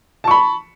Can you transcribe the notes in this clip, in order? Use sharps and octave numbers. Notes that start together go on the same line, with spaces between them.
A5 B5 C#6